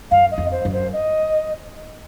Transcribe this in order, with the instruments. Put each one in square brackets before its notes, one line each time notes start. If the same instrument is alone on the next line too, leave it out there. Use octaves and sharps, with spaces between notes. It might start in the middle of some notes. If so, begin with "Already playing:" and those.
[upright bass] F#2 [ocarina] F5
[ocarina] D#5
[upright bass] F2
[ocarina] C5
[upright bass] F#2
[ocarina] C5
D#5